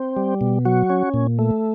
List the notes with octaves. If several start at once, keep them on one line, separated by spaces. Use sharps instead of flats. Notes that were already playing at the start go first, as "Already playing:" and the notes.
Already playing: C4
G3
B2
F#3 F#4
C#4
A#2
A3